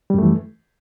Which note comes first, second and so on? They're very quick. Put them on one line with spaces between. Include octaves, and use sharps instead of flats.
G3 F#2 A3 E3